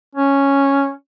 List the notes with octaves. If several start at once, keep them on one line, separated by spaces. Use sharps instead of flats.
C#4